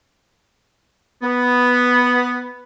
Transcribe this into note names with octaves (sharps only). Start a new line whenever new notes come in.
B3